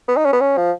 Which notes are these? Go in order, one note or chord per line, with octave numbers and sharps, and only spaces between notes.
B3
D#4
C#4
B3
C#4
F3